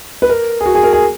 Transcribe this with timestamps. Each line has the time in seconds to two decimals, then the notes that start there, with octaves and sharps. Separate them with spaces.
0.22 B4
0.29 A#4
0.61 G#4
0.66 F#4
0.75 G#4
0.83 A#4
0.93 G#4